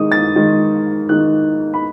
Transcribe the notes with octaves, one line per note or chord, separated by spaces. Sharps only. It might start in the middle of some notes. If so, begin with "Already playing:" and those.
Already playing: D#3 G#3 D#4 D#6
A6
D#3 G#3 D#4
D#3 G#3 D#4 F#6
B5